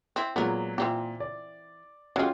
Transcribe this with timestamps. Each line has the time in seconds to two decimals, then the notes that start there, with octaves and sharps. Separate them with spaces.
0.16 C4 E4
0.36 A#2 F#3 G#3 B3 A#4
0.78 A#2 E3 C4 G4
1.20 D5
2.16 F#3 G#3 C#4 F4 G4